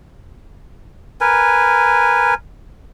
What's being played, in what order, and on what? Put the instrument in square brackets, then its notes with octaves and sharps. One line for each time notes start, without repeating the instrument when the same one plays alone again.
[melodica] A#4 B4 G#5